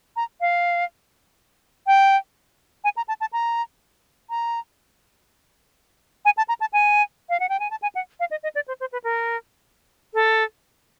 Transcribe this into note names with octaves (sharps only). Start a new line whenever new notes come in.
A#5
F5
G5
G#5
A#5
A5
A5
A#5
A#5
G#5
A5
A#5
A5
G#5
F5
F#5
G5
G#5
A5
G#5
F#5
F5
D#5
D#5
D5
C5
C5
B4
A#4
A4